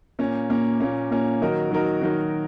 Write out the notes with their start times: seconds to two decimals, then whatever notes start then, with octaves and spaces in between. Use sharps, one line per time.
0.19 A#2 A#3 C#4
0.50 A#2 A#3 C#4
0.80 A#2 A#3 C#4
1.11 A#2 A#3 C#4
1.41 D#3 F#3 D#4 F#4 A#4
1.71 D#3 F#3 D#4 F#4 A#4
2.01 D#3 F#3 D#4 F#4 A#4